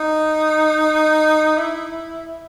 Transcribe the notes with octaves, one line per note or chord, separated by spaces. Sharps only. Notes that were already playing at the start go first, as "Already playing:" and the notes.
Already playing: D#4
E4